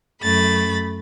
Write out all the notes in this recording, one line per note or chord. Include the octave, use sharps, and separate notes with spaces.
F#2 A3 B5 A6